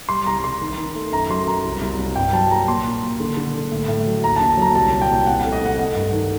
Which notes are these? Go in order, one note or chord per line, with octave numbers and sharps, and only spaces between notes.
G3 C6
C2 A#5
C2 C6
D#3
D#3
A3
F#2 A#5
F#3 C6
F#3 A#5
C2
C2
C3
G2 G5
F#3 A5
A#3 A#5
A#2 C6
A#2
A#2
D3
D3
D3
A2
A2
F#3
D#2 A#5
A5
D3
F#3 A#5
C2 A5
A#2
G5
C2
C3 F#5
A3 F#5
D#5
C3 F#5
A3 F#5
G2
D#3